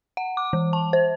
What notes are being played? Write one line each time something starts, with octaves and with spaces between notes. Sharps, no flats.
F#5
D6
E3
A5
C5